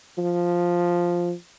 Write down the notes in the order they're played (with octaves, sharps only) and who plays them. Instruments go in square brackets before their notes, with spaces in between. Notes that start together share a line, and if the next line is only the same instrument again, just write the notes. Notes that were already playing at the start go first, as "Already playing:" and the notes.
[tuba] F3